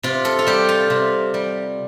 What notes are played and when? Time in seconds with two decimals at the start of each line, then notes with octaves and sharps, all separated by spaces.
0.03 C3 F4
0.25 A4
0.39 F4
0.47 G3 G4
0.69 F4
0.90 C3
1.34 G3